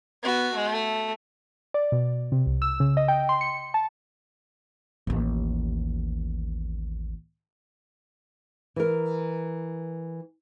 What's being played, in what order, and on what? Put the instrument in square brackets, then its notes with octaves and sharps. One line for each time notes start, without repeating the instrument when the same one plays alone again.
[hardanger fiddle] B3 F#4
A3
[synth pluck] D5
B2
C3
C2
E6
C#3
D#5
G5
C6
C#7
A5
[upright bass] A1 D#2
[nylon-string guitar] E3 A#4